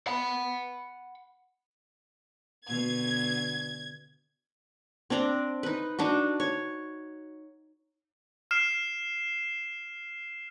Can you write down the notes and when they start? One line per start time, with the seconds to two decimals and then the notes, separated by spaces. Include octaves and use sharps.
0.07 F#5 B5
2.68 B2 D3 G#6
5.10 C4 D4 D5 A#5
5.63 D#4 B4
5.99 D4 D#4 F#4
6.40 C#5
8.51 F6 C7 E7